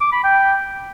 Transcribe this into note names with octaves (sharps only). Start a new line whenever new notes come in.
D6
B5
G5